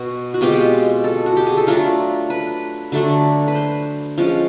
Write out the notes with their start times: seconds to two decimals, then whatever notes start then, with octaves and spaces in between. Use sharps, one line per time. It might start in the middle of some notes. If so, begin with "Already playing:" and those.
Already playing: B2 F#4
0.34 F#4
0.41 B2 G#3 C4 F4 G4
1.04 A4
1.26 F#4
1.37 G4
1.47 G#4
1.57 A4
1.67 F#3 A3 D4 F4 A#4
2.30 B4
2.92 D3 F#3 A3 D4
3.48 B4
3.55 C5
4.18 F3 G#3 C#4